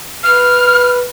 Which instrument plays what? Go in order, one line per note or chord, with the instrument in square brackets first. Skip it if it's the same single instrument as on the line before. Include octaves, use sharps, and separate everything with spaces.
[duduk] B4 [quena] F6